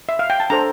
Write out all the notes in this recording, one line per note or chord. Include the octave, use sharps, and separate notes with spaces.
E5
F5
G5
A5
D4 A4 C5 A#5